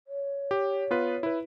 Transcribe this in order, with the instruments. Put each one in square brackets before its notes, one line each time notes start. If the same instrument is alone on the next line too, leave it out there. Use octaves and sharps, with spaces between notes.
[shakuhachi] C#5
[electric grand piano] G4
B3 F4 B4
E4 B4